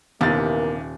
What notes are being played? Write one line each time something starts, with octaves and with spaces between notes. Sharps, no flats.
D#1 D#2 C3 E3 A#3 B3 A#4 A6